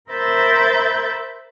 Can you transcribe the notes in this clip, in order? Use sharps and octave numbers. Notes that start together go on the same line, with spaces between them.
A#4 C5 E5 B5 G6 A6